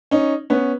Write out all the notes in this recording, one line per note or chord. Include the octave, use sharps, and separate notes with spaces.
C#4 D#4
B3 C#4